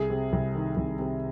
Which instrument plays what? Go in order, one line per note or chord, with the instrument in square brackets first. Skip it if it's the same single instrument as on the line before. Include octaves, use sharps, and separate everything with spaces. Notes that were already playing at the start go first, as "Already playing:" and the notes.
Already playing: [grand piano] C2 G#4
C3
C2
D#3
C2
C3